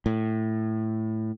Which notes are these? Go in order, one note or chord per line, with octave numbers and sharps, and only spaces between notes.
A2